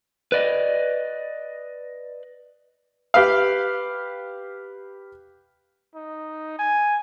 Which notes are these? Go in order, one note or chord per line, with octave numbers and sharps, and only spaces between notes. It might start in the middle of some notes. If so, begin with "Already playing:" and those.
B4 D5 D#5
G4 B4 F5
D#4
G#5